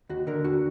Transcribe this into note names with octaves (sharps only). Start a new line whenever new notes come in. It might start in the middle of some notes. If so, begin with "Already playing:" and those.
D#2 F#4
D3 A#4
D#2 F#4